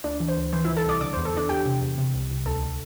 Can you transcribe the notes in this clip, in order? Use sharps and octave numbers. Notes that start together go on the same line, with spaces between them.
D2 D4 D5
E3
C5
D2
E3 C5
E3 E4 E5
A4 A5
C2 D5 D6
D3 D5 D6
E2 C5
A4
E2 D4 D5
E2 G4 G5
C3
E2
C3
C2
C2
D2 A4 A5
D3